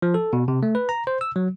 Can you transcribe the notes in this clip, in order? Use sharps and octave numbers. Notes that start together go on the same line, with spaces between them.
F3
A4
B2
C3
A3
B4
A#5
C5
E6
F#3